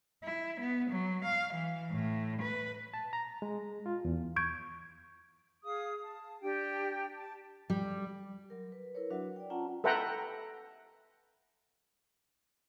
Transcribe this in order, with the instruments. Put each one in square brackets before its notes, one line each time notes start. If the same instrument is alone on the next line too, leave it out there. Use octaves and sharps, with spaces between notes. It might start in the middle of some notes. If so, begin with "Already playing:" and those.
[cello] E4
B3
F#3
F5
E3
A2
B4
[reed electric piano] A5
A#5
G#3
F4
E2
[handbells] C#6 G6 G#6 D7
[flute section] G#4 F5 D#6
A5
D4 G4 G5
A5
[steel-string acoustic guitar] G3
[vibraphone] F#3 A#4
B4
E4 A#4 B4 C#5
F#3 D4 F#4 B4 E5 F#5
D5 G5
C#4 F4 F#5 A5 A#5
[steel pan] A4 B4 E5 F#5 G5 A#5